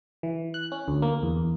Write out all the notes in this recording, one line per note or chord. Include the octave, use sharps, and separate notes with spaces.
E3
F#6
C#4
D2
A#3
E2